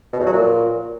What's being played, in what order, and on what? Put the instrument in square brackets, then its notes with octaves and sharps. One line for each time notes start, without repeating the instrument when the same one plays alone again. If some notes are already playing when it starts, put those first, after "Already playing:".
[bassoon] B2
E2
F#3
A#2